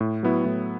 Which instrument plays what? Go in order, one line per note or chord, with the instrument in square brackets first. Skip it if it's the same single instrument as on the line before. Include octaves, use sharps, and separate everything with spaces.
[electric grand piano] A2
F#3 B3 E4
A2